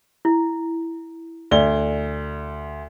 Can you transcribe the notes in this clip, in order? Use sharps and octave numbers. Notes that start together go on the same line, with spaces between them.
E4
D2 D5 G7